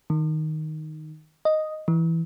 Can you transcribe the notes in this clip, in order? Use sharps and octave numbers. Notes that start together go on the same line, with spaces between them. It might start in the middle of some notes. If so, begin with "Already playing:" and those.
D#3
D#5
E3